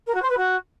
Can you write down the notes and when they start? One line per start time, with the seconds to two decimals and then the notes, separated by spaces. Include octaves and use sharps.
0.06 A#4
0.14 F#4
0.22 C5
0.29 B4
0.37 F#4